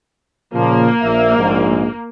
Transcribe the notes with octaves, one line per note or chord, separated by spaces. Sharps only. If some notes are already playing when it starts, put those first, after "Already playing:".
A#2 C#3 F3 A#3
A#1 E5
A#1 G#2